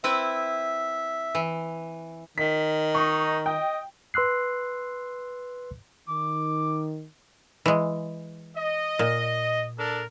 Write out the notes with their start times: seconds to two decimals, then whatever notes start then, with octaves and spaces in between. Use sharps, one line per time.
0.04 C4 E4 B4 E5
1.35 E3
2.38 D#3 B6
2.95 D#4 C#6
3.46 D#5 G5
4.14 B4 C6 E6 F#6 C7
6.09 D#3 D6
7.66 E3 G#3
8.57 D#5
8.99 A#2
9.79 D4 A4 A#4